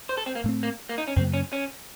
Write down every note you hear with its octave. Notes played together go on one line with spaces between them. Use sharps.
C5
A4
C4
A#3
A2 A3 C4
A#3
A#3
D#4
C#4
F#2 C#3 F#3 A#3 C4
C#4
C#4